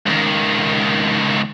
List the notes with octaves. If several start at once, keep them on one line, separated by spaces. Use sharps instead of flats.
C#2 D#3